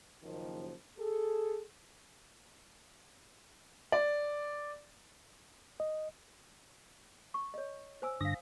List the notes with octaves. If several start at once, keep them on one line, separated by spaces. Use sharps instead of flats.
F#1 D#3 F3
G#4 A4
D5
D#5
C#6
C#5 D#5
C5 G#5 E6
G2 D3 F5 D#6 A#6